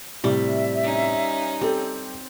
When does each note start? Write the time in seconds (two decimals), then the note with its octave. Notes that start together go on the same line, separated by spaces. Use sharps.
0.24 A2 C3 G3 E5
0.83 C#4 D#4
1.61 C4 G4 A4